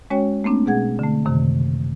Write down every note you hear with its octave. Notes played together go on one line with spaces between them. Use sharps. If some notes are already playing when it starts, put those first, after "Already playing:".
G#3 C#4 F#4 C#5 G5
A3 A#3 C4 D4
B2 G#3 G#4 F#5 G#6
D3 A3
F#2 C3 D#3